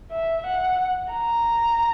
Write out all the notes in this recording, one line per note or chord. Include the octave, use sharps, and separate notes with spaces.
E5
F#5
A#5